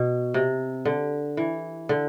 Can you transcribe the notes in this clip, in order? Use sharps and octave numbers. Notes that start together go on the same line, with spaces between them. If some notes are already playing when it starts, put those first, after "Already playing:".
Already playing: B2
C3
D3
E3
D3